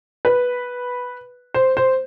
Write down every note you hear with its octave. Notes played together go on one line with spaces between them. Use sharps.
B4
C5
C5